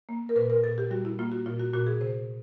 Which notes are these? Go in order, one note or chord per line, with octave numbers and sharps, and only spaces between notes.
A#3
A#4
A#2 B4
A#4
A#2 A4
G4
G3 F#4
E4
A#3 F4
F#4
A#2 F4
F#4
A#2 F#4
G#4
C3 C5